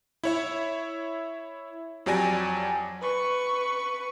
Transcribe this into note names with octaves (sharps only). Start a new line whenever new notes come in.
E4 C#5 E5
F2 F#3 G4 D5 G#5 A#6
B4 C#6